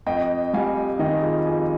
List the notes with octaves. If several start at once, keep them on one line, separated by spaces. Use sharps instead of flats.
F2 D#5 G5
G3 F5 G#5
D#3 D#5 G5
F4 G#4
F2 F4 G#4